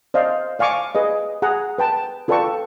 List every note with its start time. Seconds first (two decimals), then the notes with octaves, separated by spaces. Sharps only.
0.14 C5 D5 D#5 F5
0.59 D5 F5 G#5 C#6 D6
0.95 G#4 B4 D#5
1.42 G#4 F#5 A#5
1.78 B4 G5 A5
2.28 F4 A4 B4 D5 G5 C#6